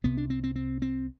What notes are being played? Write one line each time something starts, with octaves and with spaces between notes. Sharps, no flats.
C2 C3 B3
D4
C4
C4
C4
C4